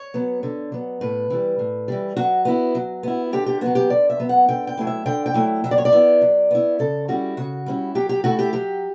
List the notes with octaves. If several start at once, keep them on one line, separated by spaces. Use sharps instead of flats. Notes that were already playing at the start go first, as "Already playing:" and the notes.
Already playing: C#5
F#3 B3
D3
F#3 B3
A2 B4
E3 G3
A2
E3 G3
F#3 F#4
B3 E4
F#3
B3 E4
D3 G4
G4
F#3 B3 F#4
G4
D3 D5
E5
F#3 B3
F#5
D3 G5
G5
F#3 A3 E4
E5
D3 G5
G5
F#3 A3 E4
F#3 E5
D5
C#5
D5
B3 E4
F#3
B3 E4
C#3 A4
G3 C#4 E4 F#4
C#3 F#4
G3 C#4 E4
F#3 G4
G4
A3 E4 F#4
G4
F#3 G4